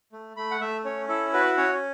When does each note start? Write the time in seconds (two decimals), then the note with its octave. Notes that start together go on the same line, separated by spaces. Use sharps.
0.12 A3
0.36 A3 B5
0.51 F#5
0.61 A3 E5
0.84 C#4 C#5
1.09 E4 A4
1.33 F#4 B4
1.57 C#4 C#5